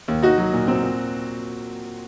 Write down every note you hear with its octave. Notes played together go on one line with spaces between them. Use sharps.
D#2
D#4 F#4
F#3
A#2
C4
A#2